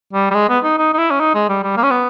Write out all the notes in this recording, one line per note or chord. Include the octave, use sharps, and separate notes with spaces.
G3
G3
G#3
B3
D#4
D#4
D#4
E4
C#4
D#4
G#3
G3
G3
A#3
C#4
B3